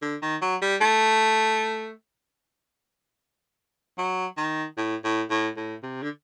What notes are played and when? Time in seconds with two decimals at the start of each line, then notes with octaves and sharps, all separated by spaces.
0.02 D3
0.22 D#3
0.42 F#3
0.62 G3
0.81 A3
3.98 F#3
4.37 D#3
4.77 A2
5.04 A2
5.30 A2
5.57 A2
5.83 C3
6.03 D3